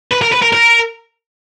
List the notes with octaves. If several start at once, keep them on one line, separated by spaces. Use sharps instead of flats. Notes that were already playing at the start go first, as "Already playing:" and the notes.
B4
A#4
B4
A#4
A#4